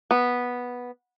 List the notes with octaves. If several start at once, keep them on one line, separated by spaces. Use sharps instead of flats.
B3